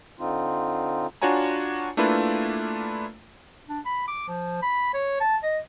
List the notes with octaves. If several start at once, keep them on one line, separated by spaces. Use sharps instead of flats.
D3 C4 D#4 F4
D4 F4 F#4 C#5 G#5 A#5
A3 A#3 D4 E4 F4 B4
D4
B5
D6
F3
B5
C#5
A5
D#5